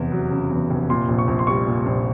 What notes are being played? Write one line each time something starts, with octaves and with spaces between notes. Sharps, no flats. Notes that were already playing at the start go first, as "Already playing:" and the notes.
Already playing: F1 E2
F#3
C#3
E2
F1
A#2 C6
A#1
C#6
A#1
C6
G3 C#6
A#2
A#1